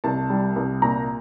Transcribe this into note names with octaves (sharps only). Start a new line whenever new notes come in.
C2 A5
G3
C2
A#2 A#5